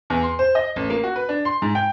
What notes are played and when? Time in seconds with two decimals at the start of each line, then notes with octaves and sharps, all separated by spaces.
0.10 E2
0.23 C6
0.39 C5
0.55 D#5
0.76 A1
0.90 A#3
1.04 F#4
1.16 B4
1.29 D4
1.45 C6
1.62 G#2
1.75 G5